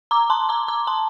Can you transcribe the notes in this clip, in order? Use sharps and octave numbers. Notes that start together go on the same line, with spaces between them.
A#5 D6
A5 C6
A#5 D6
A#5 D6
A5 C6